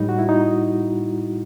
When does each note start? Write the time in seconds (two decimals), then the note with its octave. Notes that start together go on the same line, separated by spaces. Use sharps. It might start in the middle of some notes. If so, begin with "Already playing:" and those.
Already playing: A2 G3 D#4
0.09 F#4
0.19 E4
0.29 D#4